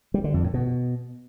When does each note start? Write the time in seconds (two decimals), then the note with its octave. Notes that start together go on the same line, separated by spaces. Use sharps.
0.14 G3
0.24 D3
0.34 F2
0.44 A2
0.54 B2